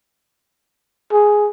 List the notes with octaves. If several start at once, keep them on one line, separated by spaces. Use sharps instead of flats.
G#4